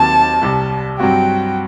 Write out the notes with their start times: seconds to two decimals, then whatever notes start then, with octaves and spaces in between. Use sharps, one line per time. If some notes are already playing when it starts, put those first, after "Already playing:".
Already playing: D#2 D#3 F#3 C4 A5
0.41 C2 C3 G3
0.99 G2 F#3 C4 F#4 G5